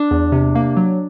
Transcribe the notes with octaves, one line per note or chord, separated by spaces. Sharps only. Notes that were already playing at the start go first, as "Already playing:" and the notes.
Already playing: D4
E2
C3
A#3
F#3